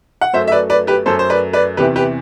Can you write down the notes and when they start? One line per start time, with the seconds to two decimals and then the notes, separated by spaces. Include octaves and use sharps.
0.21 F#5
0.33 F#2 F#3 A3 C5 E5
0.47 E5
0.52 B4 D5
0.70 B4 D5
0.87 G4 B4
1.06 F#2 F#3 A3 A4 C5
1.19 C5
1.30 B4 D5
1.53 B4 D5
1.77 E2 C3 E3 G4 B4
1.96 G4 B4